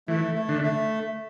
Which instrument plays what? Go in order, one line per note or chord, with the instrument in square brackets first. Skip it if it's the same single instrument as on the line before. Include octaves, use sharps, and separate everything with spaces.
[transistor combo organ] E3 [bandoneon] A3
[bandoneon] A3
[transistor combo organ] D3
[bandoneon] A3